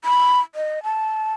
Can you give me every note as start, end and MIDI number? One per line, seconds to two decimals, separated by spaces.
0.05 0.39 83
0.55 0.83 75
0.84 1.34 81